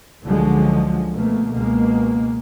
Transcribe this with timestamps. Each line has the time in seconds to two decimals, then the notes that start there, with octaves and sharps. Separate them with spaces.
0.23 C#2 D3 F3 F#3 G#3
1.13 B2 A3 A#3
1.53 C#2 B2 G#3 A#3